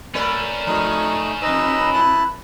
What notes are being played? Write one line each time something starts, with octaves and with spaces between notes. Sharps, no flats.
A3 C#4 A#4 B4 D5
F3 A3 D#4
F2 D#4 B4 D#5 E6
E4 A5 F#6